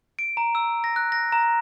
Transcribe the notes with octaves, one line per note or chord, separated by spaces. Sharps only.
D7
A#5
E6
A#6
F#6
A#6
A#5